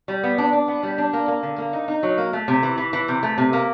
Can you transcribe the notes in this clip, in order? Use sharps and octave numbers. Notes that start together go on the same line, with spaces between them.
G3
B3
D4
D4
B3
G3
D4
A#3
A#3
D3
A#3
D#4
D#4
F#3
A#3
A3
C3
E3
E3
E3
C3
A3
C3
A#3